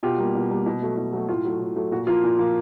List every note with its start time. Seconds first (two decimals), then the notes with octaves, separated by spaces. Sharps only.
0.03 B2 F4 G4
0.18 G3 A#3
0.35 B2
0.51 G3 A#3
0.66 B2
0.82 F#3 A3
0.97 B2
1.13 F#3 A3
1.29 A2 F4
1.45 F#3 A3
1.60 A2
1.76 F#3 A3
1.92 A#2 F#4
2.07 F3 A#3 F4
2.24 A#2
2.39 F3 A#3